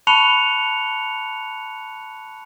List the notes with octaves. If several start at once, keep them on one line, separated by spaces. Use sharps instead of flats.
A5 B5 C#6 F#6 C#7 F7